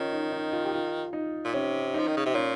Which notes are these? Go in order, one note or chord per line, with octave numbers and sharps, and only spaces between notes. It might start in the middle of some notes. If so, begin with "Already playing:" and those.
Already playing: D#3 C#4 F4
D#4
D#4
F4
G4
F4
D#4
A#2
C3 C#4
F3 D#4
D#3
C#3
C3
A#2 C#4